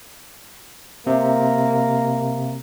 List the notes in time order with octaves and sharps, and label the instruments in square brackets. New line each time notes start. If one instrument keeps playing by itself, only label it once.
[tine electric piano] C3 [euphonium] A#3